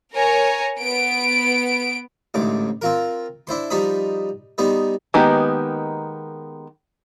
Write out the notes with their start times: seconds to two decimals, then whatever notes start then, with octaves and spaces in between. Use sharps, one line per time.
0.13 A#4 C#5 G#5 A#5
0.78 B3 D7
2.34 A1 D2 G#2 D6
2.81 C4 F4 A#4
3.47 D4 E4 C5 C6
3.70 F3 G3 D#4 C5 B5 D#6
4.58 G3 B3 D#4 C5
5.14 D#3 G#3 A#3 B3 G4